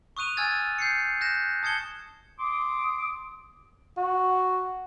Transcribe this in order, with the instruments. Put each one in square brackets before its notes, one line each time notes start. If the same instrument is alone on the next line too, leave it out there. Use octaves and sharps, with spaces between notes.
[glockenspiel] C#6 D#6 F#6 D#7 F7
G#5 E6 F6 G#6 A6
G6 C7 C#7
F#6 G6 A#6 E7
A5 D#6 G#6 C#7 G7
[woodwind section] C6 D6 D#6
[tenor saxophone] F#4